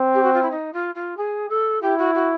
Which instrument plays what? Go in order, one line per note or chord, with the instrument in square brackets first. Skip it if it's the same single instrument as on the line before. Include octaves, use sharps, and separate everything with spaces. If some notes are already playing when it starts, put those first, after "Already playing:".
Already playing: [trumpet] C4
[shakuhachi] G4
F#4
F4
E4
D#4
F4
F4
G#4
A4
[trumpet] E4 [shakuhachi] G4
[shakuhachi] F#4
F#4